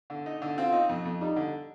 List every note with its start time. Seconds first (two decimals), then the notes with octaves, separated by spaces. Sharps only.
0.10 D3
0.26 D#4
0.42 D3
0.58 C4 F4
0.72 D#4
0.89 F2
1.05 F2
1.20 G3 D#4
1.36 D3